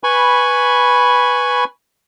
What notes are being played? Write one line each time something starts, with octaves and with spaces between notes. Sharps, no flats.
B4 G#5 B5 C#6